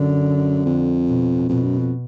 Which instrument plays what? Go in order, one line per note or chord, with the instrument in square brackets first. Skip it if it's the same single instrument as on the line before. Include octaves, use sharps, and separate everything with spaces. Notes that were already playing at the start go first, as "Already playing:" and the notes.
Already playing: [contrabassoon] F#2 [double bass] D3
[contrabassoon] F2
[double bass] B2
[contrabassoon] F2 [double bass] B2
[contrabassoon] F#2
F2